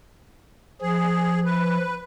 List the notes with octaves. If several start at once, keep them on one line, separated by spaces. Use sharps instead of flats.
F3 G#4
B4